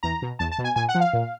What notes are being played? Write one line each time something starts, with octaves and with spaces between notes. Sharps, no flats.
E2 A#5
B2
E2 A5
A5
B2
G#5
A#2 G#5
F#5
F3
F5
A#2